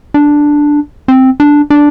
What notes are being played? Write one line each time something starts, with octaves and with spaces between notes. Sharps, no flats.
D4
C4
D4
D4